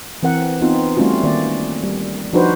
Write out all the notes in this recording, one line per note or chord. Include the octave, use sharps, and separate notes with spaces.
E3 C4 A#4 F#5
B3 C4 D#4 F4
G3 A3 C4 C#4 F4 F#4
D#3 A#3 D5
G3
F3 D4 D#4 F#4 B4 C5